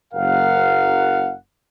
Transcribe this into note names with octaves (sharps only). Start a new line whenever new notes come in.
F#1 A#4 F5 F#5